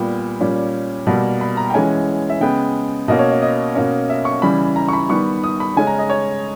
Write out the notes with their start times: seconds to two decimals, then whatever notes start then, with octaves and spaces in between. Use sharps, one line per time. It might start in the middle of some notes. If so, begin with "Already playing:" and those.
Already playing: A#2 G3 B3 G5
0.41 A#2 G3 C#4
1.07 B2 G3 A#3
1.41 B5
1.57 A#5
1.70 G5
1.74 E3 G#3 C#4 G#5
2.30 E5
2.41 C#3 G#3 B3 G5
3.08 B2 A#3 C#4 D#5
3.19 C#5
3.31 D#5
3.42 D#5
3.75 B2 A#3 C#4
4.09 E5
4.25 C#6
4.42 C#3 E3 G3 B5
4.76 A#5
4.88 C#6
4.93 B5
5.10 D#3 G3 B3 C#6
5.44 D#6
5.60 B5
5.76 C#3 G#3 C#4 G#5
5.87 A#5
5.99 D#5
6.10 C#5